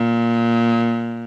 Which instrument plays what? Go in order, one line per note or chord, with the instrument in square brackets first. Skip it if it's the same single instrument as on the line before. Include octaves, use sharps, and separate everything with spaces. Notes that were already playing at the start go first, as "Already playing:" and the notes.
Already playing: [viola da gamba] A#2